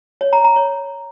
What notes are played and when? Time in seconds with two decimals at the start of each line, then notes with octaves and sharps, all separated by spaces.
0.21 C#5
0.33 A#5
0.44 A#5
0.56 C#5